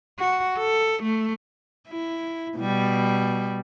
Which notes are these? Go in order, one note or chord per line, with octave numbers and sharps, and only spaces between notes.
F#4
A4
A3
E4
B2 G3